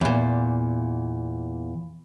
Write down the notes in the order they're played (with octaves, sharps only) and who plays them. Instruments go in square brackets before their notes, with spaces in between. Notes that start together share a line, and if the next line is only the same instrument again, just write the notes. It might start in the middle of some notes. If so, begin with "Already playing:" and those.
[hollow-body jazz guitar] E2 A#2